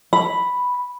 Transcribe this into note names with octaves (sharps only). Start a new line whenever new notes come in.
B5